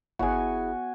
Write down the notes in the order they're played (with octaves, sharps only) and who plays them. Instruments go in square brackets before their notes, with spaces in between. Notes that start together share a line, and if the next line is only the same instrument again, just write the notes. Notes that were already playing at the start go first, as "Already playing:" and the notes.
[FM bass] G1 [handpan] B3 C#5 F#5 [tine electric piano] E4 G#4 [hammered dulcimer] F#4 G#5